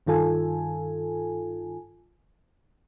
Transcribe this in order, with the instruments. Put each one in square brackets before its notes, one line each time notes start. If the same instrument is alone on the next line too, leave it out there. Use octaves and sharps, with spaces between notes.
[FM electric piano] G2 D#3 F4 A4 G#5